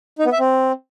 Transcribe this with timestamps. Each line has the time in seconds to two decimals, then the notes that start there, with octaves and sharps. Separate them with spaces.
0.19 D#4
0.26 B3
0.32 E5
0.39 C4